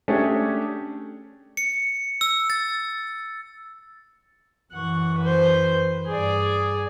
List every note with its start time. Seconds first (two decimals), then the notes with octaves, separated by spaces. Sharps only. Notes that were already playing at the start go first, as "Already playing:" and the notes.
0.08 A3 C#4 D4 G4 G#4
1.57 C#7
2.21 E6
2.50 A6
4.73 F#2 E3 F#5 C#6
5.19 B4 C5
6.07 G2 G#4 D5